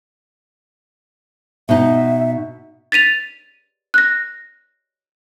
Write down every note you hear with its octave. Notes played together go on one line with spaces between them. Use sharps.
B2 D#4 E5
A6 B6 D#7 F7
F#6 A#6